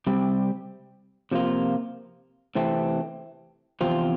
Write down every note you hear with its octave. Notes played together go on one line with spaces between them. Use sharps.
C3 G3 C4 G4
C3 F3 A#3 F4
C3 E3 A3 C4
E2 C3 F3 C4 F4